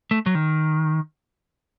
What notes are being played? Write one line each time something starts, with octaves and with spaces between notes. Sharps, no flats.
A3
F#3
D#3